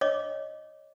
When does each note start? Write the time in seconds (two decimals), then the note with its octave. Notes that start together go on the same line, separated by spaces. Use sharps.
0.01 C#5 D#5 D6